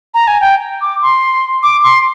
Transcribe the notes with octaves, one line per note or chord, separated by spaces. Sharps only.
A#5
G#5
G5
D6
C6
D6
C6